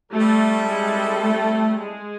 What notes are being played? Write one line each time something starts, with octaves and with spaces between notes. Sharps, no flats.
G3 A3 C4 E4 A4
G#3
A3
G#3